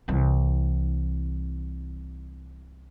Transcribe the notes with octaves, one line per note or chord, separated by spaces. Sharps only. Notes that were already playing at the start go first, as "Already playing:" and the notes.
C2 E3